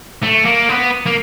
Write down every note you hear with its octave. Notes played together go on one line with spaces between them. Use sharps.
A3
A#3
B3
A#3